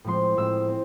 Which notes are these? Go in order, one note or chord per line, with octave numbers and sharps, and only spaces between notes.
A2 F3 G#3 C4 C6
A2 F3 G#3 C4 E6
C4